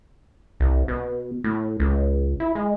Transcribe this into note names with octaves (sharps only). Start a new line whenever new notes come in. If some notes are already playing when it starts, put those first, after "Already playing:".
C2
B2
A2
C#2
E4
G#3